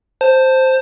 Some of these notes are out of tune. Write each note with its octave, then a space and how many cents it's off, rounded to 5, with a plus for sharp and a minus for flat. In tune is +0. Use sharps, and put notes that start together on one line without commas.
C5 +0 A5 +20